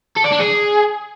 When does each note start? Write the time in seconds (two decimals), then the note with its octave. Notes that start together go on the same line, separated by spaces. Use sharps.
0.17 A4
0.25 D5
0.32 D4
0.40 G#4